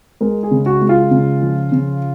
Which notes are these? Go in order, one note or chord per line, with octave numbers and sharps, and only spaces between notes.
G#3 A#4
G#4
C#3
F#4
G#3
F4
C#3
F3
C#3